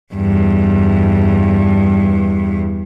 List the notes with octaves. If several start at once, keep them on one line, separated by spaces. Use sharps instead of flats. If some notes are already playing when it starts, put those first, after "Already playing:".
E2 G2